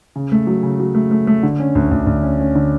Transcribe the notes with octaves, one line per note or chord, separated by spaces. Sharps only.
C#3
A3
F#3
C#3
F#3
A3
A3
A3
D3
C#4
D2
D2
D2
C#4
C#4
D3